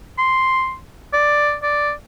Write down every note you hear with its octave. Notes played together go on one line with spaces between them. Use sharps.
C6
D5
D5